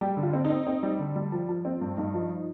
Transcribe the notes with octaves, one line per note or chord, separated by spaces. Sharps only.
G3 G4
D3
F4
C4
D#4
C4
C4
G3
D3
G3
F3
F3
C4
G2
G2 D#4
F3